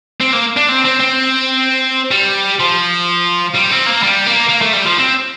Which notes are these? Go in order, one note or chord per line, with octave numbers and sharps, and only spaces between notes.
C4
A#3
D4
C4
C4
C4
G3
F3
G3
C4
A#3
G3
A#3
A#3
A3
G3
F3
C4